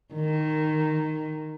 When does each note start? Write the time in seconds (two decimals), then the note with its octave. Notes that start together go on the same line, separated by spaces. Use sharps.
0.14 D#3